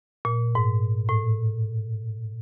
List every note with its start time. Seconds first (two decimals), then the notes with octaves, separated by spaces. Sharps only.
0.25 A#2
0.55 G#2
1.09 A2